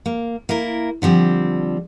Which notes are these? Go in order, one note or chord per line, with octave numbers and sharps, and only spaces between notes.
A#3
A#3 E4 A#4
D3 F3 G3 C4